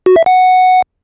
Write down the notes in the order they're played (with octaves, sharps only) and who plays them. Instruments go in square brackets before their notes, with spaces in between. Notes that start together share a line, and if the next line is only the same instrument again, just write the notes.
[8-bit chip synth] F#4
E5
F#5